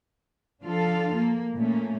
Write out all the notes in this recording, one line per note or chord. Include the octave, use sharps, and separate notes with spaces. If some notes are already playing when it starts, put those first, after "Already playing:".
F3 D4 F4 A4 F5
A#3
A#2 A3 A#3 C#4